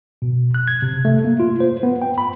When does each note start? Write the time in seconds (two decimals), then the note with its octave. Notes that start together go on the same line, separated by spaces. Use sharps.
0.22 B2
0.54 F#6
0.68 G#6
0.82 C3
1.05 A3
1.25 A#3
1.40 F4
1.60 C5
1.83 B3
2.02 G5
2.18 B5